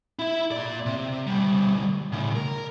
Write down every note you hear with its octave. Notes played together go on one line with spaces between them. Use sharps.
E4 E5
A#3 D5
C3
D2 G3
A2 C#3
A#4